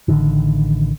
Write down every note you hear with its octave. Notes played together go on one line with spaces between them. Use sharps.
A1 D3 D#3